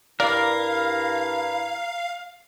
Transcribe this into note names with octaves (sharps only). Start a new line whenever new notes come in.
G2 E4 A#4 D5 F5